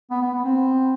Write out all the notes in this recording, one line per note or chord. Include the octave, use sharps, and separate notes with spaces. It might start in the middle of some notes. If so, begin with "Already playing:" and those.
B3
B3
B3
C4